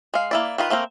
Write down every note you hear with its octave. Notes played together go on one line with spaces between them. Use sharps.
G#3 F5
A#3 E4 D5
D#3 F4 B4
A3 A#3 C4 A#4